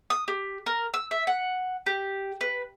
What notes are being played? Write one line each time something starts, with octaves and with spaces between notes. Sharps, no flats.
D#6
G4
A#4
E6
E5
F#5
G4
B4